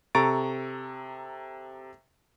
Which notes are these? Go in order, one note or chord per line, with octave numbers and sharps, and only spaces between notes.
C3 A4 A#5 C#6 A6 D7